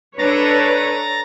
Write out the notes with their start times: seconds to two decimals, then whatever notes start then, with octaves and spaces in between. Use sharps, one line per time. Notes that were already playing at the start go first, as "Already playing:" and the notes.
0.19 D4 A4 B4 C#5 A#5 A6 A#6